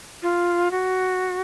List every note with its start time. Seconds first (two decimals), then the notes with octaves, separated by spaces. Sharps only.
0.23 F4
0.71 F#4